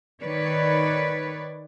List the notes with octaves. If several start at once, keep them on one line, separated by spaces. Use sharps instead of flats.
D#3 B4 C#5 D5